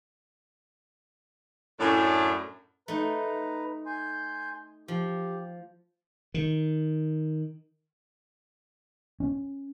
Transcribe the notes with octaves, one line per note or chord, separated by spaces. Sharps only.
F#2 A2 D4
A3 D#4 B4 A#5
G#5 C6 G6
F3 G4
D#3
C#4